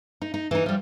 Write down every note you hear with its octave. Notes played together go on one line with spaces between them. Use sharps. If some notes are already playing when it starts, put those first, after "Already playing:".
D#4
D#4
E3 D#4
F3 G3